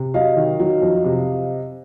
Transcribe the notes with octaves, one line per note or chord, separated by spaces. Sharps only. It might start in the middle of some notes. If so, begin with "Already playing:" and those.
Already playing: C3
F#3 D#5 F5
D#3
F#3
F2
C3